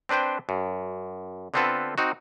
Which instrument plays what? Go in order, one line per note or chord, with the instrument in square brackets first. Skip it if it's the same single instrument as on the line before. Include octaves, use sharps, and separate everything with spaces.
[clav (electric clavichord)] C4 D4 B4 C5 G5
F#2
D3 B3 C4 F4 A4 B4
C4 D#4 F#4